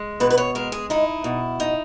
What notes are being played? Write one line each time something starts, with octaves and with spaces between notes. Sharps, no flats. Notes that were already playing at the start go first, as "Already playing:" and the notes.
Already playing: G#3
B2 B4
B4
C#5
G#3 A#4
G#4
D#4 E4
B2
D#4